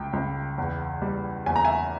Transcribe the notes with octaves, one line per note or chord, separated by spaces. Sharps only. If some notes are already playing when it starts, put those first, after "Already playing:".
Already playing: C#2 G5
C#2
E2
G3
E2 G#5
A#5
E5 G#5